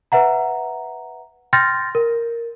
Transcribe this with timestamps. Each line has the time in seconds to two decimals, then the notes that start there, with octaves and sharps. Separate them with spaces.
0.12 B4 E5 F#5 A#5
1.53 G5 C6 F6 G6 A6 A#6
1.95 A#4